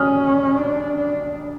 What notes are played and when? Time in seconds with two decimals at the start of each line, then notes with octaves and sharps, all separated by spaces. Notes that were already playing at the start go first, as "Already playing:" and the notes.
Already playing: C#4 D#6 F6
0.57 D4
0.96 D4